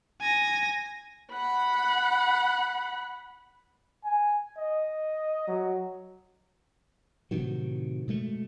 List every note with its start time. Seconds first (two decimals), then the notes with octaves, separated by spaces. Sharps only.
0.21 G#5 A#6
1.32 F#5 B5
4.04 G#5
4.58 D#5
5.48 F#3
7.31 A2 C3 D#3 F#3
8.08 B2 G#3 A3